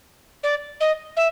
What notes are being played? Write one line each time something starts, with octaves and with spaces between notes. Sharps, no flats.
D5
D#5
E5